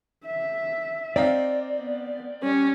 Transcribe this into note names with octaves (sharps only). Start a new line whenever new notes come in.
E5
C4 D#4 D5 F5
B3
G3 C#4